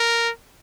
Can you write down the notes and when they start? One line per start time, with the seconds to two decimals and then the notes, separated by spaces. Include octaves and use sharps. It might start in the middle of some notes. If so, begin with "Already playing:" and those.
Already playing: A#4